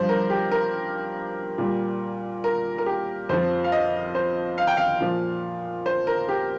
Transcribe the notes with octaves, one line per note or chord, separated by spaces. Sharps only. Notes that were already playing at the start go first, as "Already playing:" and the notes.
Already playing: G2 F3 C5
A#4
G4
A#4
A#2 G3
A#4
A#4
G4
F2 F3 C5
F5
D#5
C5
F5
G5
F5
A#2 F3
C5
A#4
G4